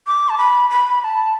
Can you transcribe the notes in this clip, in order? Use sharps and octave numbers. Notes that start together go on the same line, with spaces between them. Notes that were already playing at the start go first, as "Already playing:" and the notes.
D6
A5
B5
B5
B5
A5